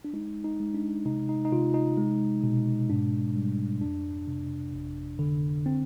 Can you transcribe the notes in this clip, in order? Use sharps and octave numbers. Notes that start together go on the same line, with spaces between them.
D4
G#3 D#4
D#4
G#3
D4
C3 D#4
D#4
D#4
C3 F4
D#4
G#3
B2
G#2 D4
G3
F2 D4
C3
G#1
D3
C4